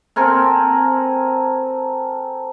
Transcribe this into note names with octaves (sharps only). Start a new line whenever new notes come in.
C4 A4 A#4 G#5